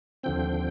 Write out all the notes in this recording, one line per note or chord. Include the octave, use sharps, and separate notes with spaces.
D#2 D3 F3 C4 G5